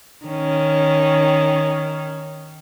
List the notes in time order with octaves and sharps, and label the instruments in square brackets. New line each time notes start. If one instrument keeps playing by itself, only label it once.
[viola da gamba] D#3 C#4